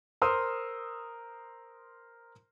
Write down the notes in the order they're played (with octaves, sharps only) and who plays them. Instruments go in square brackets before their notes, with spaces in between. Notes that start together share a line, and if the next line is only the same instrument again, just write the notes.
[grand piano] A#4 C5 C6 D#6 E6